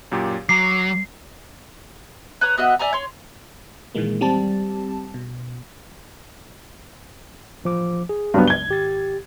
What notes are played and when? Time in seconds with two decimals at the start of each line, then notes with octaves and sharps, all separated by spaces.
0.12 F#2 A#2 G4
0.49 F#3 A#5 D6 C7
2.41 B4 C#5 A#5 D#6
2.57 B3 F#4 D#5 E5
2.79 D5 E5 G#5 A#5
2.93 C#5 C6
3.95 A#2 D#3 E3 G#3 A#3
4.21 G3 C4 G4 A5
5.14 B2
7.64 A1 F3 D6
8.09 G#4
8.34 C#2 G2 F#3 B3
8.48 G#6 G7
8.68 G#1 G4 A6